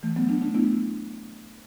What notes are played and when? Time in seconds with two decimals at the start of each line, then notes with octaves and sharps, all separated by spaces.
0.03 E3 A3
0.16 F#3 B3
0.29 A3 D4
0.42 A3 D4
0.55 B3 E4